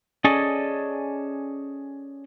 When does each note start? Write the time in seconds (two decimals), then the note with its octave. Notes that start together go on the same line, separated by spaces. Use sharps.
0.24 C#4 G#4 A4 D5 D#5